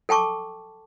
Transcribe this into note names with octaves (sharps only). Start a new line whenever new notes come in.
A4 G5 A5 C#6 D6